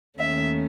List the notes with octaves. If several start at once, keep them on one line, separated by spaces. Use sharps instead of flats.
D#2 D#3 A3 C#4 E5